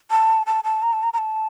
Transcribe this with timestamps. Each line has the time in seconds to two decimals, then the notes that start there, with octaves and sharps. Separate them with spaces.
0.11 A5
0.47 A5
0.64 A5
0.83 A#5
0.93 A5
1.03 A#5
1.13 A#5
1.18 A5